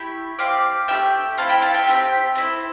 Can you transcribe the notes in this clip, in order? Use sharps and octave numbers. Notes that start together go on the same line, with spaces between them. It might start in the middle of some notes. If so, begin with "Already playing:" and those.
Already playing: A3 E4 G4
C4 G4 D5 F5
A3 E4 G4 E5 G5
C4 E4 A4 F5 A5
G5 B5
F5 A5
E5 G5
C4 E4 G4
C4 E4 A4